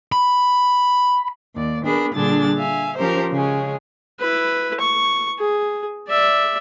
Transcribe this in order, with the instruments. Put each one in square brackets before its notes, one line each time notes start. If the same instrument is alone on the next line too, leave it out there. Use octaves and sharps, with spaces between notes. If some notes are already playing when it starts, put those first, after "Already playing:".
[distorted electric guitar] B5
[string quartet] D#2 D5
B3 D4 G#4 A#4 B5
A#2 D3 G3 D4 G#4 A6
E5 F5 G#5
F3 C#4 G4 A#4 C5
C#3 G#3 C#4 G#4
[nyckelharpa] E4 B4
C#6
G#4
D5 E5